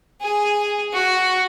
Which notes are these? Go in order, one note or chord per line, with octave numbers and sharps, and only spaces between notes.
G#4
F#4